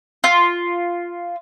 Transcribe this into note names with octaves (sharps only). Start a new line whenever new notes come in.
F4